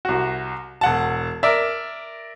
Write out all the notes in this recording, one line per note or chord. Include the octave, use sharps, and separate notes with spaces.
C2 F#4
E1 F#5 A5
A#4 D5 E5